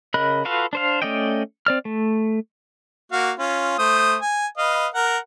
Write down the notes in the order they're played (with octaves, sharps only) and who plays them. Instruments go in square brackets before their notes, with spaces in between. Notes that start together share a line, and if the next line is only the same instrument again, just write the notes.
[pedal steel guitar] C#3 A#4 D#5 B5 F#6
F4 F#4 A4 B4 F5
D4 C5 F5
A3 C#4 D5 D#5 G5
C4 D5 F6
A3
[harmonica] A#3 F#4 F5
C#4 F4
A3 C5 D#6
G#5
B4 D#5 F5
A#4 F#5